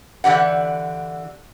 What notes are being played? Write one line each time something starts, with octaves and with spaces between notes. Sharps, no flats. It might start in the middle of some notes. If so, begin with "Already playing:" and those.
D3 E3 G4 F#5